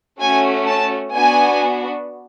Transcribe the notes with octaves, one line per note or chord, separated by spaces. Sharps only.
A3 C#4 F#4 G#5
A5
B3 D4 F#4 G#5